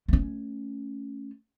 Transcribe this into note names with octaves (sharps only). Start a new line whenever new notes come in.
A3 C#4